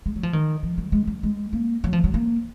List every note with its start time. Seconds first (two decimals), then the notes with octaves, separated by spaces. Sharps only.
0.06 G#3
0.16 F#3
0.23 F3
0.33 D#3
0.63 F3
0.78 F#3
0.92 G#3
1.07 F#3
1.23 G#3
1.53 A#3
1.84 F#3
1.93 F3
2.04 F#3
2.14 A#3